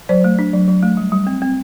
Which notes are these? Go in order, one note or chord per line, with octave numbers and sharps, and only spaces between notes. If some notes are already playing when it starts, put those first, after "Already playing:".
F#3 C5 D5
A3
D4
F#3
F#3
A3
G3
G3
C4
C4